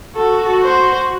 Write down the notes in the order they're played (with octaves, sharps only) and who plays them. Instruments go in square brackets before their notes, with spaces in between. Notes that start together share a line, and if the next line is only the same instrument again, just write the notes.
[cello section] F#4 [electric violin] A4
[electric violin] C5